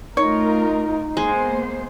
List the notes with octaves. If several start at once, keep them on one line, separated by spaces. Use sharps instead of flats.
A3 D#4 F4 A#4 C#5
G#3 A#3 B3 C5